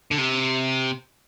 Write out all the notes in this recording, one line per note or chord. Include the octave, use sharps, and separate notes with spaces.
D3
C3